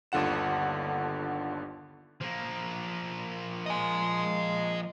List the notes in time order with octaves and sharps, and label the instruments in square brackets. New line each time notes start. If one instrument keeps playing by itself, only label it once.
[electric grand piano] G1 D#2 D3 F4 F#5 E7
[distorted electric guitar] F3 A#3
[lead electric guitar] D#5 G#5